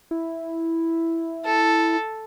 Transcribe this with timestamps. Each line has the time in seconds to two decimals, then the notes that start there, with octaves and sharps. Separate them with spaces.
0.11 E4
1.45 A4